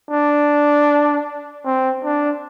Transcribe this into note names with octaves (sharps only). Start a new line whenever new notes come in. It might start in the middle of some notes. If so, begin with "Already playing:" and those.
D4
C4
D4